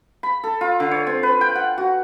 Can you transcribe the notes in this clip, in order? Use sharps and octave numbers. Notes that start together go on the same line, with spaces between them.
B5
A4
F4
D3
C#5
C4
B4
G5
F#5
F#4